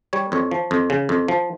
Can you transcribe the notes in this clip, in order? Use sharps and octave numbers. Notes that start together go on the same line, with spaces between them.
G3 C#5
F2 C#5
F3
F2
C#3
F2
F3